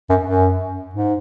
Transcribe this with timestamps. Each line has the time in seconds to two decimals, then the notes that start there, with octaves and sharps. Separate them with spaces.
0.10 F#2
0.27 F#2
0.94 G#2